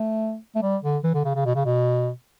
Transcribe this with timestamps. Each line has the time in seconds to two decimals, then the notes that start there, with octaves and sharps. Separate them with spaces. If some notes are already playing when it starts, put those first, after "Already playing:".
Already playing: A3
0.56 A3
0.63 G3
0.83 D3
1.04 E3
1.14 D3
1.25 C#3
1.36 C#3
1.45 B2
1.56 C#3
1.65 B2